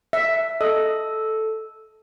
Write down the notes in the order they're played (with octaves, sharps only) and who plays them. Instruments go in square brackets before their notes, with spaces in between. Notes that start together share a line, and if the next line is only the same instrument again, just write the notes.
[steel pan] E5
[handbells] A4 [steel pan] D#5